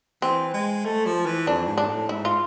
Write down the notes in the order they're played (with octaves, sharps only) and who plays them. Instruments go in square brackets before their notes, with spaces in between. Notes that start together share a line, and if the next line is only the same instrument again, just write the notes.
[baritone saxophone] E3 [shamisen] C4
[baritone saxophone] G#3
A3
F3
E3
[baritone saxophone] F2 [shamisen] D4
[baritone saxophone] G#2
[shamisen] D4
[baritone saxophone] A2
[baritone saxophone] G#2 [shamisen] E4
[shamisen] F4